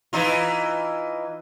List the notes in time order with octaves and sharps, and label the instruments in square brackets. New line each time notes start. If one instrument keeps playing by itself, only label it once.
[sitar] E3 D#4 F4